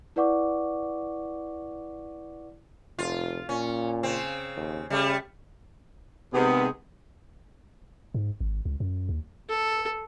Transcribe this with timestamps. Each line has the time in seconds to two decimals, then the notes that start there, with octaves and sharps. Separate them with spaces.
0.16 E4 B4 D5 F#5 C#6 D6
2.99 F1 F4
3.49 A#2 C#4
4.03 C#3 C4
4.56 D#2
4.90 C#3 G3 A3
6.33 C3 D#3 G#3 B3 G#4
8.14 G#2
8.41 G#1
8.65 C#2
8.80 F#2
9.09 D#2
9.49 A4